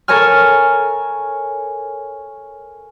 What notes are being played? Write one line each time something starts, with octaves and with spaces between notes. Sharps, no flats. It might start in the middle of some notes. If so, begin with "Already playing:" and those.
A4 A#4 C#5 G#5 F6